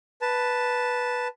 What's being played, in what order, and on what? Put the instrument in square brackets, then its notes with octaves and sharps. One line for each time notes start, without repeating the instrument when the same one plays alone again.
[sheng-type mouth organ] B4 A5